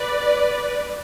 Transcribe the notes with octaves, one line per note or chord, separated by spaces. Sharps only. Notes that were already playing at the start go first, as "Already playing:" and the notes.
Already playing: B4 D5